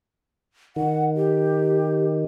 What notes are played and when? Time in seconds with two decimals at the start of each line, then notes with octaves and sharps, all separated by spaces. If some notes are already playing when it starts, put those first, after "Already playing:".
0.76 D#3 F#5
1.15 G4